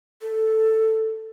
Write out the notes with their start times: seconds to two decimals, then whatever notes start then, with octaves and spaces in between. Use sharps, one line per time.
0.22 A4